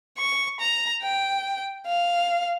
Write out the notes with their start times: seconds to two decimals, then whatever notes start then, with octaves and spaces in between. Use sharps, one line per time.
0.19 C#6
0.60 A#5
1.02 G5
1.87 F5